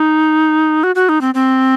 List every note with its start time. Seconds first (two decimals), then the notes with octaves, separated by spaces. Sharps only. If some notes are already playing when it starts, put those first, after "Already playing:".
Already playing: D#4
0.84 F#4
0.95 F#4
1.09 D#4
1.21 C4
1.35 C4